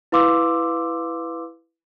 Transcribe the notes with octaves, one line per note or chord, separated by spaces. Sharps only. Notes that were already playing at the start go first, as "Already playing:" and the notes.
E4 B4 F5 C6 D6 E6